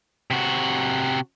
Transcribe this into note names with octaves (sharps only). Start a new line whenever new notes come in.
C3 F#4